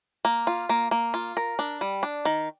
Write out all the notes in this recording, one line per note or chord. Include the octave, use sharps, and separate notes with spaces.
A#3
F4
A#3
A#3
F4
A#4
D4
G3
D4
D#3